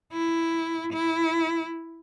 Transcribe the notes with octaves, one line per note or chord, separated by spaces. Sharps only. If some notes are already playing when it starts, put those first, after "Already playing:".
E4
E4